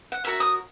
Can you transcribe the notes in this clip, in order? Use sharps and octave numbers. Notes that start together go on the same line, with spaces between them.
F#5
F#4 A#4 C#5 E5
D#6